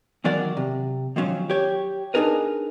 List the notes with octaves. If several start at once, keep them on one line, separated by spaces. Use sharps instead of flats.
E2 D#3 F#3 A#4 D5 F#5
C3
D#3 F3 F#3 C#4
G4 C#5
D4 D#4 G#4 A#4 B4